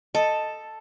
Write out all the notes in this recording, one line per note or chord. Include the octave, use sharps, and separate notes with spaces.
A4 D#5